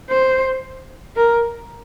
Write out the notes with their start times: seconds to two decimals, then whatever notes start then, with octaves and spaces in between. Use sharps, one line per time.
0.10 C5
1.16 A#4